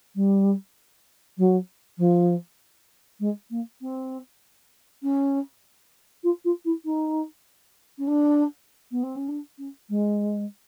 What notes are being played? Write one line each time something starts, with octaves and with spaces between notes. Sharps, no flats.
G3
F#3
F3
G#3
A#3
C4
C#4
F4
F4
E4
D#4
C#4
D4
B3
C4
C#4
D4
C#4
G#3